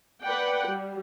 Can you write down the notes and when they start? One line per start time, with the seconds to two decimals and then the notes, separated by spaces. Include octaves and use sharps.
0.23 B4 D5 F#5 G5
0.65 G3